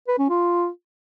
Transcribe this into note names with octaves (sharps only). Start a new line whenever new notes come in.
B4
C#4
F4